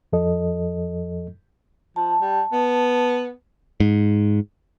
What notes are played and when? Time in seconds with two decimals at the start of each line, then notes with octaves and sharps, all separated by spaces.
0.13 F2 F3 A4 D#5
1.96 F3 A5
2.21 G3
2.52 B3
3.80 G#2